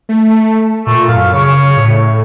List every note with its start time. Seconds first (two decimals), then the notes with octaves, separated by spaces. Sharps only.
0.09 A3
0.87 A#2 A3
1.08 F#2 F5
1.33 C#3 C#5
1.77 A2